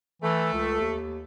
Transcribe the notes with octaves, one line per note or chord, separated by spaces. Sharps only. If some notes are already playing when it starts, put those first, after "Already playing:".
E3 A3
C#2
D#2